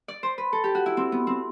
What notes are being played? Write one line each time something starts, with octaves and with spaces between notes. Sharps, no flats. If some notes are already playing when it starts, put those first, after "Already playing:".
D5
C5
B4
A4
G4
F#4
E4
C4
B3
C4